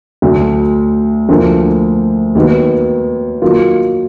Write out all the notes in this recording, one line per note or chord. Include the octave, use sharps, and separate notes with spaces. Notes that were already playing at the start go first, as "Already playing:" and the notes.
D2 D3 F#3 D4
D2 D3 F3 A#3
D#2 D#3 F#3 B3
D#3 F#3 A#3 F4